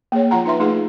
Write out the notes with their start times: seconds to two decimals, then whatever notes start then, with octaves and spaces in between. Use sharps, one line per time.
0.12 A#3 G#4 C#5
0.31 F3 F4 F#5 A#5
0.45 D#4 B4 E5 C6
0.60 A3 D#4 F4 G#4 B4 F#5